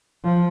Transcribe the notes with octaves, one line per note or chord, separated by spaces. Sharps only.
F3